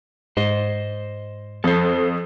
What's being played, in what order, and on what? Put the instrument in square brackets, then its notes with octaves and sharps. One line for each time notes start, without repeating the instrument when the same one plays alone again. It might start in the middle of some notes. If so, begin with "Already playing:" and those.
[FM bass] G#2 [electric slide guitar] C5 D#5
[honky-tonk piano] F2 [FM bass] C4 [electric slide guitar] A4 C5